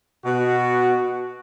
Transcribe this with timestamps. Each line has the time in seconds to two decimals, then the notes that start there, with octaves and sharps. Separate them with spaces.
0.24 B2 F#4